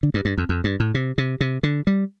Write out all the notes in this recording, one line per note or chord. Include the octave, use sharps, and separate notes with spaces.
D3
G2
G2
F2
F2
G2
A2
C3
C3
C3
D3
G3